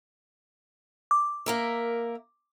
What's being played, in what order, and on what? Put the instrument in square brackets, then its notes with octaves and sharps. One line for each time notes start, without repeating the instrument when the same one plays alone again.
[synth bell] D6
[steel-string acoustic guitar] A#3 A#4 E5